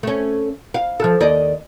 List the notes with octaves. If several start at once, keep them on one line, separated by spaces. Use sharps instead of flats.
A3 C#4
F5
F3 A4
D#2 D5 D#5